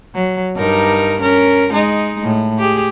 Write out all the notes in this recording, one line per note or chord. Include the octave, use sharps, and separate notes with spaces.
F#3
G2 D#4 A#4
C#4 A#4
G#3 D#4
A2
G4 G#4